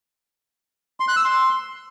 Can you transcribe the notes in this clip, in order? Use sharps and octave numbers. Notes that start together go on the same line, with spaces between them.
C6
F#6
E6
C6